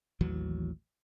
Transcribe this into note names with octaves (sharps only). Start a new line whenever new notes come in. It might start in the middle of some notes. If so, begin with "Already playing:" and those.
A1 D#2 E3 F#3